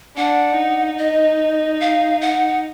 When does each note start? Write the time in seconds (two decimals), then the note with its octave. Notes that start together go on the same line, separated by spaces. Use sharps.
0.17 D4 F#5
0.57 D#4
0.98 D#5
1.80 F5
2.21 F#5